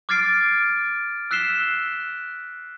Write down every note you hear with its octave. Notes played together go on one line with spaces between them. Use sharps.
D6 F6 G#6 A6 C7 D7
E6 F#6 B6 C7 E7 G7